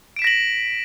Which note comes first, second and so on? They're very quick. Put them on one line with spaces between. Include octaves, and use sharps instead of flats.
D7 E7 B6 A#6 F#7